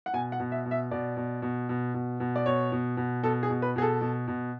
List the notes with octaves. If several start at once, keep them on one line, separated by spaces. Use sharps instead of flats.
F#5
B2 G#5
F#5
B2
E5
B2
E5
B2 D5
B2
B2
B2
B2
B2
D5
B2 C#5
B2
B2
B2 A4
G#4
B2
B4
B2 G#4
A4
B2
B2